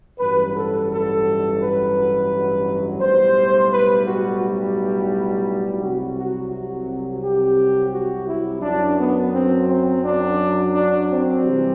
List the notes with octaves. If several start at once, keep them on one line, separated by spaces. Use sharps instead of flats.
A1 G2 F#3 B4
A4
A4
B4
B1 A2 G3 C5
B4
F#4
F#4
C2 C3 F#3 F#4
F#4
F#4
G4
F#4
E4
F#2 F#3 D4
B3
C4
C4
D4
D4
C4
C3 E3 G3